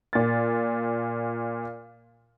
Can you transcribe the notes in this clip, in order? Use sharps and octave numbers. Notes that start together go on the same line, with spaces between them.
A#2 A6